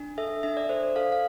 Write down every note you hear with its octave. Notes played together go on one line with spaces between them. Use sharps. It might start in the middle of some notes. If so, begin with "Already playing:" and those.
Already playing: D4
A4 E5
D4 E5
D5
A4 C5
D5
A4 F5
F5